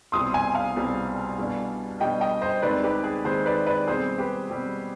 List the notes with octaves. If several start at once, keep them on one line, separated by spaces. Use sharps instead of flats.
C2 B2 G3 C4 C6 D#6
G#5 C6
F5 G#5
C2 B2 G3 C4
B2 G3 D4
B2 G3 D4 D#5 G5
D#5 G5
C5 D#5
D#2 D#3 G#3 C4 B4 D5
G4 B4
G#4
D#2 D#3 G#3 C4 G#4 C5
B4 D5
B4 D5
B2 G3 C4 G#4 C5
G4 B4
B2 G3 C4